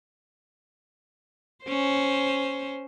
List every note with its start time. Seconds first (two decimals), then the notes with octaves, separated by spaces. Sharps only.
1.64 C#4 C5